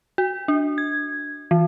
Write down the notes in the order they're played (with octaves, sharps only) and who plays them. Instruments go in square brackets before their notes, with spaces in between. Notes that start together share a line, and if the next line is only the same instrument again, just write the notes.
[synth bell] F#4
D4
G#6
E3